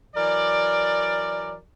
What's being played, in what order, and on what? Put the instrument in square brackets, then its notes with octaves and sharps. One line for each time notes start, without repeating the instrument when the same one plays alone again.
[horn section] E3 F#3 A#4 D5